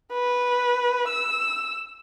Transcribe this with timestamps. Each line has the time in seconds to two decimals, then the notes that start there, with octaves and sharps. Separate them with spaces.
0.13 B4
1.08 E6